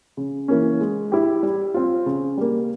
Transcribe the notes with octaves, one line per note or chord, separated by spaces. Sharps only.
C#3
E3 A#3 C#4
G#3
E4 G4
G3
C4 F4
C#3
G3 A#3